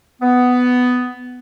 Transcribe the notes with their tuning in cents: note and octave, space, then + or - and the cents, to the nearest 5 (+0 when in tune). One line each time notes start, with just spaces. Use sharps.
B3 +10